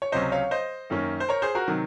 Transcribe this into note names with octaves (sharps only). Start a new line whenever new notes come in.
C#5
C#2 C3 F#3 C#4 C5 D#5
C#5 F5
C5 D#5
F#2 D#3 A#3 C#4
C5
A#4 C#5
G#4 C5
F#4 A#4
C3 D#3 F#3